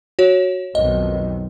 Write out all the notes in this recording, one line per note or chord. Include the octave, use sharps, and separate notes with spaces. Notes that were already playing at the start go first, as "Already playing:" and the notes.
F#4 C#5
B1 F2 D#3 D#5